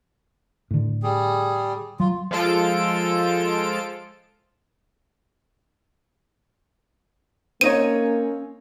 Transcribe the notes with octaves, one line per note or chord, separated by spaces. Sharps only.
A2 D3
G3 G#4
F#3 F4
F3 G#3 F4 A4 D7
A#3 C4 C#4 D#4 C#5 D#7